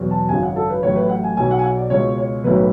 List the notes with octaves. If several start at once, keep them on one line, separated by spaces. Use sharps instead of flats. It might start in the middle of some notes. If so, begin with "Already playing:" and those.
Already playing: E2 B2 F#3
A5
G#1 F#2 C#3 G#5
F#5
A4
B4
A1 A2 F#3 C#5
B4
F#5
G#5
B1 B2 F#3 G#5
F#5
G#5
F#5
D5
C#2 B2 G#3 C#5
C#5
B1 A2 F#3 B4
B4